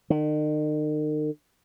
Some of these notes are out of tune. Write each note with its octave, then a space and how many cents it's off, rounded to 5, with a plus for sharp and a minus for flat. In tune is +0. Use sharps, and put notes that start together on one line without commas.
D#3 -40